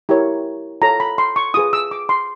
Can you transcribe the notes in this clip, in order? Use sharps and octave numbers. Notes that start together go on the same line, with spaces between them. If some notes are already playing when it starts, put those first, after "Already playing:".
E4 G4 A#4 C#5
F4 A4 C#5 A#5
B5
C6
C#6
F4 G#4 B4 D#6
E6
D6
C6